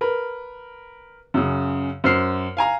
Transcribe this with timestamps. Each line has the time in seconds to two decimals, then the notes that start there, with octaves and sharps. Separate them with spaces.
0.01 A#4 B4
1.34 F#2 C#3
2.04 F#2 C5 F6 C7
2.57 F5 G#5 A#5